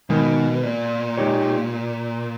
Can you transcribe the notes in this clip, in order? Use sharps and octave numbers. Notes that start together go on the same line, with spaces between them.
B2 D#3 G#3 D#4 A#4
A#2
G#3 D#4 G4 C#5